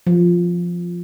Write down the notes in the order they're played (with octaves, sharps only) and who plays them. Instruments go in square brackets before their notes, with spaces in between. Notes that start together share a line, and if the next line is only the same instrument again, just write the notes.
[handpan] F3